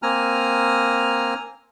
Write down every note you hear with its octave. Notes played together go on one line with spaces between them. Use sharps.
A#3 C4 G#5 A#5 F6